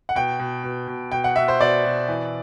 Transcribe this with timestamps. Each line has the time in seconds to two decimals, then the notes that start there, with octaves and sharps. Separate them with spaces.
0.09 F#5
0.15 B2 G5
0.39 B2
0.64 B2
0.88 B2
1.12 B2 G5
1.24 F#5
1.36 B2 E5
1.48 C5
1.60 B2 D5
1.85 B2
2.08 E3